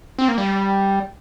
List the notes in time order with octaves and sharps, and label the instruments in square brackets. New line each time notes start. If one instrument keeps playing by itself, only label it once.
[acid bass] C4
A#3
G3